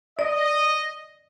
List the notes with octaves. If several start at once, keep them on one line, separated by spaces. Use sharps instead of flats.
D5 D#5